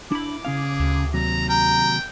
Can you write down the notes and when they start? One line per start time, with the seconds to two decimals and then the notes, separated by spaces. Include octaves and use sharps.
0.12 D4 E4 B5 D6
0.45 C#3 C#4 G#4 F5
0.80 D2
1.14 D#2 C3 F#3 A#5
1.49 G5 A#5